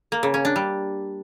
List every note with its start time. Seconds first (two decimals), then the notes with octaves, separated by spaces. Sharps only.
0.12 A#3
0.23 C#3
0.34 C#4
0.45 D4
0.56 G3